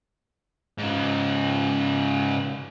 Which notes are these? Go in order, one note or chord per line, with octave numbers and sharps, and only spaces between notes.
G#2 C#3